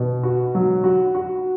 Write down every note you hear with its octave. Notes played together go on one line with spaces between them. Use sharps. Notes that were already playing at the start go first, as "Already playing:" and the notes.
Already playing: B2
F#4
F#3
F#4
F#4